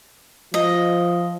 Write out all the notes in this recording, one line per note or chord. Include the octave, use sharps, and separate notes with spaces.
F3 D#5